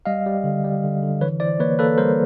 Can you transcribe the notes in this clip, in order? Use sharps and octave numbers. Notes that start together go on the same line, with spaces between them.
G3 D#5 F5
G3
D3
G3
D3
D3
E3 B4 C#5
E3 C5 D5
A#3 B4 C#5
A#3 A4 B4
G3 A#4 C5